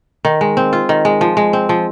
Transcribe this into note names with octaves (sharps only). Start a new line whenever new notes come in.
D#3
G#3
C4
F4
D#3
G#3
F3
G#3
C4
F3